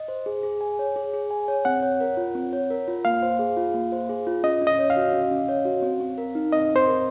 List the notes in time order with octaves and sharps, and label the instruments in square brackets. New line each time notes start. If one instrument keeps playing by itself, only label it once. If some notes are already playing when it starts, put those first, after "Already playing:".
Already playing: [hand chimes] D#5
C5
G#4
G#4
G#5
C#5
G#4
G#4
G#5
C#5
[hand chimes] C4 [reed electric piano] F#5
[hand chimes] C#5
A#4
F4
C4
C#5
A#4
F4
[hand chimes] A#3 [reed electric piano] F5
[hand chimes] C5
G#4
F4
A#3
C5
G#4
F4
[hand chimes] C#4 [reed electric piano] D#5
[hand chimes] C#4
[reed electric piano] D#5
[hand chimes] C#5
[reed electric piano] F5
[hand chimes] F#4
C#4
C#4
C#5
F#4
C4
C4
A#4
D#4
[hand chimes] C4 [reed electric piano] D#5
[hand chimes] C4
[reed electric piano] C5
[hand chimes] A#4